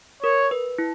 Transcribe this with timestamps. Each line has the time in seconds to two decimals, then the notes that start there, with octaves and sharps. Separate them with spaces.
0.23 A#4 C#5
0.51 B4
0.79 E4